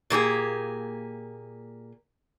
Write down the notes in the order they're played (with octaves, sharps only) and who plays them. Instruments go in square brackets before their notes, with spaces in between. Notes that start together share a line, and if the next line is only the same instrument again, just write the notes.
[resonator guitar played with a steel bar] A#2 A#3 G4 G#4